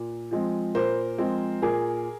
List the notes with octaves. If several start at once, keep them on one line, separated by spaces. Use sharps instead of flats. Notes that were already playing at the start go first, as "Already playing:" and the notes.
Already playing: A#2
F3 G#3 C4
A#2 A#4 C5
F3 G#3 C4
A#2 G#4 A#4